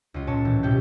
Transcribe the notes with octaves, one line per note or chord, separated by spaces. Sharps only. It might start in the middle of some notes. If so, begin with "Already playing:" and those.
C#2 F4
A#2 C#5 A5
A2 E3
A#1 B2 F#3 G4 G5